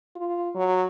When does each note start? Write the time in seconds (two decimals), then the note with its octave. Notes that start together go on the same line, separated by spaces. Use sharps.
0.16 F4
0.55 F#3